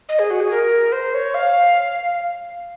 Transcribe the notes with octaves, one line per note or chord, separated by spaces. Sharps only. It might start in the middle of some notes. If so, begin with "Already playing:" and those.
D#5
G#4
F#4
G#4
A#4
C5
C#5
F5